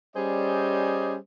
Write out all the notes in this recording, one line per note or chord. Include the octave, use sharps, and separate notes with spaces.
G3 C#4 G#4 C5 D5 D#5